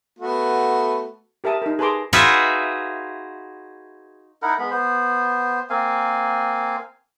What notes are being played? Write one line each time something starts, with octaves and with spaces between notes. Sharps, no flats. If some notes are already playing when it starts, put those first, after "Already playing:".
A3 B3 F#4
G4 A#4 E5 A5 D#6
D#4 A#4
G#4 B4 A5 A#5 C6 D6
D#4 F4 F#4 G#4 B4 E5
D#4 E4 A#4 F#5
G#3 B3 B5
B3 C5
A#3 C4 F5 G#5